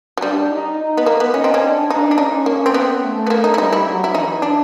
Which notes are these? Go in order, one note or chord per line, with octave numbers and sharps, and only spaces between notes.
F#3
G3 D4
D#4
D#4
B3
A#3
B3
C#4 D#4
C4
C#4
D4
D4 D#4
D4
C#4 D#4
A#3
C4
B3
A3
B3
A#3
D#4
E4
G3 D#4
E4
F#3
E4
E3 D#4
D4